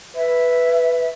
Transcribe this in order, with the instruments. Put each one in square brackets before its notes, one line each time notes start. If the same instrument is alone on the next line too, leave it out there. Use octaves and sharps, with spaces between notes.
[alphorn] B4 [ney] E5